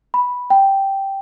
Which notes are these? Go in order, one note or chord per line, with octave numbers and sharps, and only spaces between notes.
B5
G5